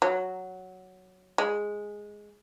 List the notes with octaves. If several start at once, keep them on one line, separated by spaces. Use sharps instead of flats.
F#3
G#3